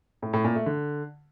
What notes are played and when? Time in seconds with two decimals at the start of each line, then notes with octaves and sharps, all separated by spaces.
0.22 A2
0.33 A2
0.44 A#2
0.55 A3
0.66 D3